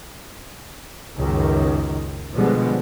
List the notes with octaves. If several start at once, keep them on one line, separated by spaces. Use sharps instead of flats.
C#2 F#2 D#3
B2 D3 F3 G3 G#3 B3